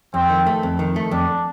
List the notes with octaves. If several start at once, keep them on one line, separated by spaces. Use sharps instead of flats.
F2 C4
D#3
A3
F2
D#3
A3
F2 D4